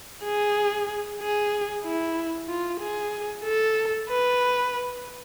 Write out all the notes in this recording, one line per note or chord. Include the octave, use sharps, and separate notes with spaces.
G#4
G#4
E4
F4
G#4
A4
B4